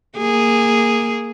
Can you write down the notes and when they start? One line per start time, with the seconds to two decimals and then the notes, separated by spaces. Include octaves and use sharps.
0.18 A#3 G#4